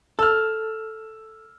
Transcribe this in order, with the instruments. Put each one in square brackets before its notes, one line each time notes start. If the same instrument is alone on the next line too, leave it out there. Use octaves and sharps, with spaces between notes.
[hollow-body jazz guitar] A4 [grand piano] E6 F6